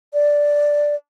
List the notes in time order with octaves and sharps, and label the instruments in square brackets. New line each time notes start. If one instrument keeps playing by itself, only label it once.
[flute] D5